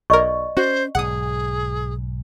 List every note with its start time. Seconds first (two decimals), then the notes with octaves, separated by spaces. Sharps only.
0.10 B1 A#4 D5 D#5 C#6
0.57 C#4 F#4 C5
0.95 B1 G#2 G#4 F#5 D#6